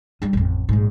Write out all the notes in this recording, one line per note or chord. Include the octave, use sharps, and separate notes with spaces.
G3 D#4
A1 F2
A#1 G#2